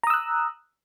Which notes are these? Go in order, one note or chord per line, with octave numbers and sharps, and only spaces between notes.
A#5 D#6 E6 F#6